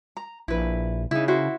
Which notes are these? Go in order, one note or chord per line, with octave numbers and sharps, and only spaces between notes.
A#5
A#1 E4 B4
C#3 D#4 E4
E4 F#4 C5